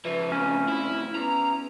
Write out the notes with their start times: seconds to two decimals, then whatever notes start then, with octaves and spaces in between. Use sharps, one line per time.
0.05 C#3 F3 B4 E5
0.32 F2 A2 C4 C#4
0.68 E4
1.15 E2 E3 A#5